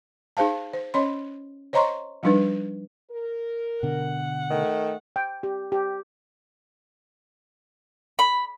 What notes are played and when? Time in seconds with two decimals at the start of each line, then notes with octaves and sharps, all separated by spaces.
0.37 D#4 G#4 C5 F5 A5
0.74 C5
0.94 C#4 C#5 D#5 C6
1.73 C5 C#5 D#5 A#5 C6 C#6
2.23 F3 G3 D4 D#4 B4
3.11 A#4
3.83 B2 D3 F#5
4.50 D#3 A3
5.16 G5
5.43 G4
5.72 G4
8.19 B5